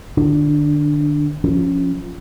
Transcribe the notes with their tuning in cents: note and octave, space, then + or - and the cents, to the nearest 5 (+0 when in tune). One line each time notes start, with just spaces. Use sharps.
D3 +35 D4 +0
F3 +0 C#4 +0